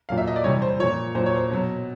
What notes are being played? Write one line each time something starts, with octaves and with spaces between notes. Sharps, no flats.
A#2 F#3 F5
E5
D#5
D5
C3 E3 G3 C#5
C5
A#2 F3 C#5
A#2 F#3 C5
C#5
C5
B2 F#3